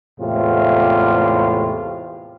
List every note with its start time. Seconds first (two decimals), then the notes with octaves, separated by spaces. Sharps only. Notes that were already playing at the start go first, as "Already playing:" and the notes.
0.20 E2 A2 C3 G#3 F4